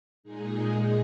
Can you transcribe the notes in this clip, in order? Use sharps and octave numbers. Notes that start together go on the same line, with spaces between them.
A#2 G#3 D#4 G#4
G#4